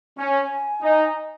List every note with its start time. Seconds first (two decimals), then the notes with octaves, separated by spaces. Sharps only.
0.18 C#4 G#5
0.82 D#4